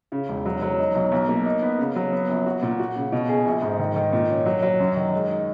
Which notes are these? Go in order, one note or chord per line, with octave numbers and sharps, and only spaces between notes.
C#3
E1
F#3
F#3
D#4
B1
B1
A#3
D#4
B3
C#3
F#3
B3
A#1
F#4
A#2
F#4
C#3
B2
G#4
A#1
G#2
D#3
D#3
A#2
C#4
F#3
F#3
F#2
D#3
G#3
D#4